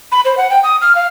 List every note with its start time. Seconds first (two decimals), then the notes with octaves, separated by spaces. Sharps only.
0.12 B5
0.25 C5
0.37 F#5
0.50 G5
0.64 D#6
0.81 F6
0.95 F5